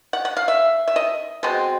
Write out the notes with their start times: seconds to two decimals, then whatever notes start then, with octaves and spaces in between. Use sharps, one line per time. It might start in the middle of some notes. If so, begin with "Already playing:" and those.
0.13 F#5
0.25 F#5
0.37 F5
0.48 E5
0.88 E5
0.96 D#5
1.43 B2 G#3 C4